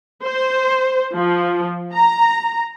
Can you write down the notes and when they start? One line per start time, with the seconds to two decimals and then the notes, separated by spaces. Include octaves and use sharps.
0.23 C5
1.13 F3
1.94 A#5